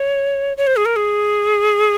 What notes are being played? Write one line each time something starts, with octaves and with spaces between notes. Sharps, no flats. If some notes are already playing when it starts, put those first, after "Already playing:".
Already playing: C#5
C#5
C5
G#4
A#4
G#4